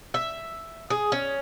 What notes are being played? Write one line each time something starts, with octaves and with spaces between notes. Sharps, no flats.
E5
G#4
C#4